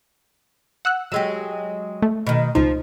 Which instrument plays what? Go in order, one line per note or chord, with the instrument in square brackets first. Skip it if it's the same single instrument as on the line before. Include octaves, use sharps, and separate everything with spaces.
[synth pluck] F#5 E6 F#6
[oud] F#3 G#3 G4 [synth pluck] E6
[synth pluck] A3
[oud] B2 D#3
[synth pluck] C#2 D#4 [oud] F3